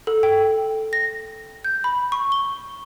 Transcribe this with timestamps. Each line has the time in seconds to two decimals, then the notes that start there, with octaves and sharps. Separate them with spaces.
0.07 A4
0.23 G5
0.93 A#6
1.64 G6
1.84 B5
2.12 C#6
2.32 G7